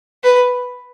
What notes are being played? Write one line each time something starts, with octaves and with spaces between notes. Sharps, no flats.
B4